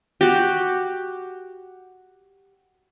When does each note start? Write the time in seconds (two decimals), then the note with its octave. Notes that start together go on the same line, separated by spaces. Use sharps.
0.21 F#4 G4